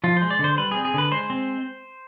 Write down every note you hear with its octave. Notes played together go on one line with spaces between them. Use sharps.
F3 F4
G#3 C5
D5
D3 C5
G3 B4
C4 G#4
G#4
D3 B4
G#3 C5
C4